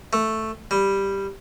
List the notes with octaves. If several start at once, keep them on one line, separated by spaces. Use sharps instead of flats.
A3
G3